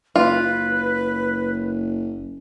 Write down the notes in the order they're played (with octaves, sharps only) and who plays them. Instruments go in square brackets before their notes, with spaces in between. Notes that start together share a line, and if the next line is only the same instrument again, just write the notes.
[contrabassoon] F#1 [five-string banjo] F4 [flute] B4